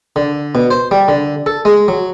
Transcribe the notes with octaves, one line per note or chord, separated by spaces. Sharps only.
D3
B2
C5
G3
D3
A4
G#3
F#3